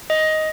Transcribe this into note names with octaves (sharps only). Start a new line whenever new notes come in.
D#5